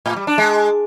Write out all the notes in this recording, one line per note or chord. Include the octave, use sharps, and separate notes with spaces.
A2
G3
D4
G#3